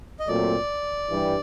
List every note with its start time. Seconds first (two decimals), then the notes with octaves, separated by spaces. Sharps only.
0.19 D#5
0.28 A#2 F#3 A3 C4 D5
1.09 G2 E3 G3